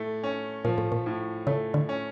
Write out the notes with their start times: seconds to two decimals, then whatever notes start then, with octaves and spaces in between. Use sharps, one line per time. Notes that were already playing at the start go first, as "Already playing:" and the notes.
Already playing: A2 A3
0.23 C#4
0.65 A#2 F3
0.78 A2
0.92 A#2
1.06 A2
1.47 C#3 A3
1.74 D3
1.89 C#4